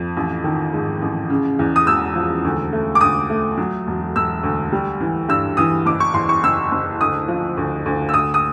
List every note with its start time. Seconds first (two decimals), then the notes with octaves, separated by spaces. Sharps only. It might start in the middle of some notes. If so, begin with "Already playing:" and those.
Already playing: F2
0.17 A1
0.44 D#3
0.73 G#2
1.02 A1
1.30 C#3
1.59 E2
1.76 D#6
1.87 E1 E6
2.15 F3
2.45 D2
2.73 A3
2.95 D6
3.01 D2 D#6
3.30 A3
3.58 F#3
3.87 E1
4.16 E1 E6
4.43 D2
4.72 G3
5.01 E3
5.29 G2 E6
5.57 E3 D#6
5.86 F#1 D6
6.00 C#6
6.14 E2 C6
6.29 C#6
6.43 F#1 E6
6.72 F#1
7.01 D2 D#6
7.28 F3
7.57 D2
7.86 D2
8.09 E6
8.14 D2 D#6
8.34 D#6